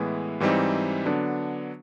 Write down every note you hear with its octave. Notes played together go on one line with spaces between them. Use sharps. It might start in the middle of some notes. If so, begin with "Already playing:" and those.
Already playing: A2 E3 G#3 B3 E4
G#2 E3 G3 C4 D#4
D3 F#3 B3 D4